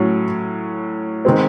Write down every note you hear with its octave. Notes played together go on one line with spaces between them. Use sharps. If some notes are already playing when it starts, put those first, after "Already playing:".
Already playing: A2 F#3 C#4
D#3 G#3 C4